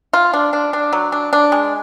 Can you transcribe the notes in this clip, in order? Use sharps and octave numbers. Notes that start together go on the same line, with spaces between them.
F4
D4
D4
D4
F#3
D4
D4
G#3